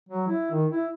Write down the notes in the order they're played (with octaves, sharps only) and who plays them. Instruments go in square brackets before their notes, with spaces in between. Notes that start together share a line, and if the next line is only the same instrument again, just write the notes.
[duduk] F#3
E4
D#3
E4